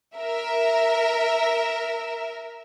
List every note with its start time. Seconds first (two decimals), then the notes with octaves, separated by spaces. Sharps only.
0.15 A#4 E5